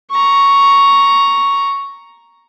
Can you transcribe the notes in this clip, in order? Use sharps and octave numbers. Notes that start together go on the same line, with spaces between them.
A#5 C#6